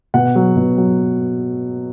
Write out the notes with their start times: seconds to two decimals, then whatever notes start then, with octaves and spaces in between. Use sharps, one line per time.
0.14 B2 F#5
0.35 F#3
0.57 B2
0.78 F#3